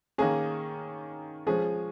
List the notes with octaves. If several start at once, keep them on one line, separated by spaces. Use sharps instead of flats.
D#3 A#3 C#4 G#4
F3 G#3 C#4 G#4